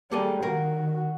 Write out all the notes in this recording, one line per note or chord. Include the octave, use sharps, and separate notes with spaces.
G3 G#3 A#3 A4 G#5
D#3 F#4 A#4 F5